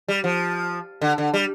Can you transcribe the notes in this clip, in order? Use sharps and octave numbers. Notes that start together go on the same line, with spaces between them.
G3
F3
D3
D3
G3